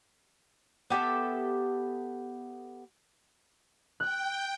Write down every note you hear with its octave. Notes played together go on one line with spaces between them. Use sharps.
B3 G4 A4 E5
G5 F#6